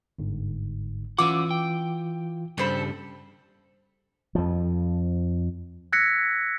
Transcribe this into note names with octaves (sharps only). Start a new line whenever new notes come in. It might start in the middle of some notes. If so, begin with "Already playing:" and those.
G1 G#2
E3 C#4 F4 F#5 D6 E6
G5
G2 C#3 G3 A4 C5 B5
F2 F3
E6 F#6 G#6 A#6 B6 C#7